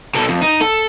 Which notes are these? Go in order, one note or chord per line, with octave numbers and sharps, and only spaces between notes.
B2 A4
F2
D#4
A4